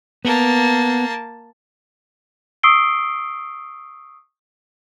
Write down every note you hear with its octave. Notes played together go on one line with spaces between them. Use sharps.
A#3 B3 A5
C#6 D#6 E6 C7 D7 G7